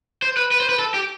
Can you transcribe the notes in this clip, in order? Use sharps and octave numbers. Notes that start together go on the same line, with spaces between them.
C5
B4
B4
C5
B4
A4
G4